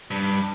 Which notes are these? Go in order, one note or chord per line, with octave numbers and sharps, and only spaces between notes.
G2